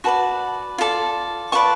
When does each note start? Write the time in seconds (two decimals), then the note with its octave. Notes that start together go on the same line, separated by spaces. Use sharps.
0.04 F#4 B4 D5 A5 C#6
0.78 F4 A4 D5
1.52 F4 B4 D5 A5 C#6